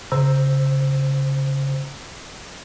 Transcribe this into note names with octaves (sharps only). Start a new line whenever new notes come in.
C#3 C5 A#5 E6